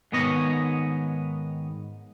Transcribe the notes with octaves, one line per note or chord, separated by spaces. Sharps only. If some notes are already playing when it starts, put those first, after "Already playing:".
G#2 D#3 B3 C#5 D#5